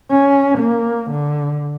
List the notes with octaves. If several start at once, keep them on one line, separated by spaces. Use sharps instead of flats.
C#4
A#3
D3